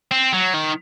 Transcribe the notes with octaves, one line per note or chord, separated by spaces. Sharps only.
C4
F#3
D#3